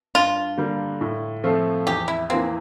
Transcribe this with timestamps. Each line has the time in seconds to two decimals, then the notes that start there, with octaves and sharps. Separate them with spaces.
0.15 G2 F4
0.57 D3 G3 A#3
1.01 A2
1.44 F3 A3 C4 F4
1.87 E2 G4
2.08 E4
2.30 E3 A#3 C4